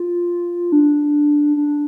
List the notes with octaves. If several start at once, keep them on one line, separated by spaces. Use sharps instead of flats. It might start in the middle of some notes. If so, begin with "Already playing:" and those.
Already playing: F4
D4
D4